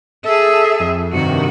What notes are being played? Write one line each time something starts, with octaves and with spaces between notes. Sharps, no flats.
G#4 A4 E5
F2
G2 C3 D#3 F#4